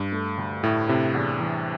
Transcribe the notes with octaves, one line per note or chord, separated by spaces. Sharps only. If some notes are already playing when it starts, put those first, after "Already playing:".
Already playing: G2
A3
D2
A2 E4
C3 E4
E2
E3